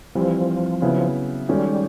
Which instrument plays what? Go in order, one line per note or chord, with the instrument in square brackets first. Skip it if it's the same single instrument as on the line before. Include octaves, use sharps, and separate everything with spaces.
[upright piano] E3 G3 C4 [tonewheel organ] F3
[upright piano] C#3 F#3 B3 E4
[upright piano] D#3 G#3 C#4 F#4 A4 [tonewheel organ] G3